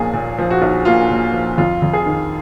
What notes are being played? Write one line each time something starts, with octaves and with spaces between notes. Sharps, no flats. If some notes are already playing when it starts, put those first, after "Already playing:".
Already playing: B1 A#2 F3 A#3 G#4
A#2
F3
F#4
B1
A#3 F4
A#2
F3
F2 F4
F2
G#4
D#3